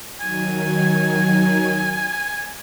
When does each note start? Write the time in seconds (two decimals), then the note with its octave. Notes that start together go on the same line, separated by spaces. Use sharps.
0.20 D#3 F#3 G#5